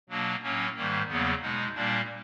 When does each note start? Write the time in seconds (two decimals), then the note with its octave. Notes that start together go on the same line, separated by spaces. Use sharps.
0.09 B2 F#3 A#3 D4
0.43 A2 F#3 A#3 C#4
0.76 G#2 D#3 G3 A#3
1.08 E2 C#3 F#3 A#3 B3
1.41 B2 G#3 D#4
1.75 A#2 G3 A#3 D4